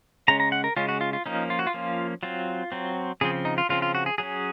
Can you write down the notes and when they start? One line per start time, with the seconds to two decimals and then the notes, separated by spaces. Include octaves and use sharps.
0.28 C#3 G#3 C#4 A#5
0.40 A#5
0.52 F#5
0.64 A#4
0.76 C#3 G#3 C#4 F4
0.89 F#4
1.01 F4
1.13 F4
1.26 F3 A#3 C#4 D#4
1.50 F4
1.59 F#4
1.67 F4
1.74 F3 A#3 C#4
2.23 F#3 C4 F4
2.72 F#3 C4
3.21 C#3 F3 C4 G#4
3.45 D#4
3.58 F4
3.69 C#3 F3 C4 F4
3.82 F4
3.95 F#4
4.06 G#4
4.18 F#3 C#4 G#4